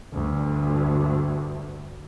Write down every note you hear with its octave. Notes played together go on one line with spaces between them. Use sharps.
D2 G2